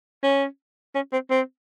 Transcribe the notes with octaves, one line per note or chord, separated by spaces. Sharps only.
C#4
C#4
C4
C4